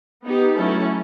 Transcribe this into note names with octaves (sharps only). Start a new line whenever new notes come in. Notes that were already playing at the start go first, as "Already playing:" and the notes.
B3 D#4 G4
F#3 A3 C#4 E4 A4